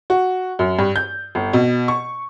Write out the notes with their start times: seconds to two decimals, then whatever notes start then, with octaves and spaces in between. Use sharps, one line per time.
0.10 F#4
0.59 F#2
0.79 G2
0.96 G6
1.35 G1
1.53 B2
1.88 C#6